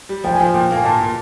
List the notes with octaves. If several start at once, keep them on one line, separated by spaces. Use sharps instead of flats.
G3
F3 G5
G#5
F3 G5
A#2 G5
A#3 G#5
A#2 A5
A#2